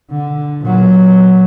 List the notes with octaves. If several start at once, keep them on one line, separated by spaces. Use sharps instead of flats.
D3
A#2 F#3